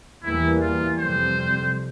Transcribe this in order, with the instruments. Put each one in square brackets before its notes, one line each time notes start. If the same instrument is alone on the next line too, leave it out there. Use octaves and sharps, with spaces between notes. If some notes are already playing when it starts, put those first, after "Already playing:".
[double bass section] E2 E3 G3 A#3 [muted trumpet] E4
[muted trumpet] F4
[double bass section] F2 C3 G3 [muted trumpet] C5